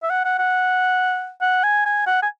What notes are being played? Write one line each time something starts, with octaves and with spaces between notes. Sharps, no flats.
E5
F#5
F#5
F#5
F#5
G#5
G#5
F#5
G#5